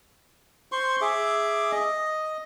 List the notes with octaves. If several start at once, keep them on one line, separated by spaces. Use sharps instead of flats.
C5 C6 C#6
G#4 E5 D6
D#5